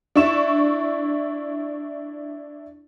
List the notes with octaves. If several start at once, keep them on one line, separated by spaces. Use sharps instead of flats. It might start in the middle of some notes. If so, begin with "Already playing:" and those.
D4 E4 C#6 E7